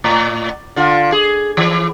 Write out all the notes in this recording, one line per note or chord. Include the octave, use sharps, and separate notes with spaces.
A2
D3 F4
G#4
E3